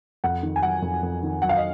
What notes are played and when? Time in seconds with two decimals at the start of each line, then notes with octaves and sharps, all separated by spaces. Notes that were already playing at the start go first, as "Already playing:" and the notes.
0.24 F2 F#5
0.43 D#3
0.56 G#5
0.63 F#3 F#5
0.82 F2
1.03 F2
1.23 D#3
1.42 F#3 F#5
1.49 F5
1.56 D#5